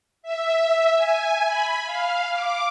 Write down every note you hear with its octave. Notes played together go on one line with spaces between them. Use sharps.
E5
G#5
B5
F5
D6